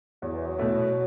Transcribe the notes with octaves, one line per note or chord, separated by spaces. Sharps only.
E2 F#3
E3
F#3
B2 A3 E4